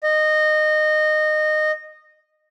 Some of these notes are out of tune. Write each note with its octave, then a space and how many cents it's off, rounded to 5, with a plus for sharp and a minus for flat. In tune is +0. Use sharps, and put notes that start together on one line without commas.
D#5 -20